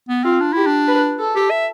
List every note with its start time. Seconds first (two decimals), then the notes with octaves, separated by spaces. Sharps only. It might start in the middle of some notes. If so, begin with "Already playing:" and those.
0.09 B3
0.24 C4 F4
0.41 D4
0.53 E4 G4
0.67 D4
0.88 B4
1.19 A4
1.35 G4
1.51 E5